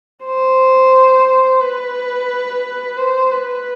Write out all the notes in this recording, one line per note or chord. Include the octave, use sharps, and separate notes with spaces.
C5
B4
C5
B4